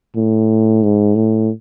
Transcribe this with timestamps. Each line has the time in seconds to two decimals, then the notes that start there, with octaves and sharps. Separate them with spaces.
0.17 A2
0.83 G#2
1.15 A2